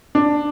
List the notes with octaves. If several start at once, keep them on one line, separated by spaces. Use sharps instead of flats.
D4